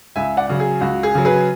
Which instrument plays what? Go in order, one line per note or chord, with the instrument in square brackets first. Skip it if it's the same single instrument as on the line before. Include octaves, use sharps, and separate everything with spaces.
[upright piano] C#2 E5 G#5
D5 F#5
C#3 F#3
G#4
C#2 F#4
G#4
C#3 F#3
G#4 B4